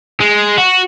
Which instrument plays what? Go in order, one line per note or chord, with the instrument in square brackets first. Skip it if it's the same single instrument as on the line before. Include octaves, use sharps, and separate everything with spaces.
[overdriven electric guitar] G#3
F#4